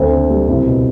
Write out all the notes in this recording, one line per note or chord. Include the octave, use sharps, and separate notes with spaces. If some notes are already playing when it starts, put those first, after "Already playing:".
Already playing: D2 C4
D3
G3
C2
B2